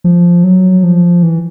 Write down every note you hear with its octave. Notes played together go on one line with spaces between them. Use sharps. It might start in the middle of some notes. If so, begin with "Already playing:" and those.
F3
F#3
F3
E3